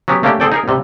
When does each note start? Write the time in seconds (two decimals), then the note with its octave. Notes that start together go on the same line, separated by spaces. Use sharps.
0.08 F#3 B3 C#4 G4
0.23 A3 A#3 C#4 D4 G4
0.40 C4 G#4 A4 D5 G5
0.52 D#4 G#4 A#4
0.68 C3 G3